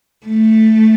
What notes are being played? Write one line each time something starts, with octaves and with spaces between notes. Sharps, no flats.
A3